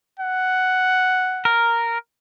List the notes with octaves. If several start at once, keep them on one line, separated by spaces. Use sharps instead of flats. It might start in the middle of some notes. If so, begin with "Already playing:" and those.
F#5
A#4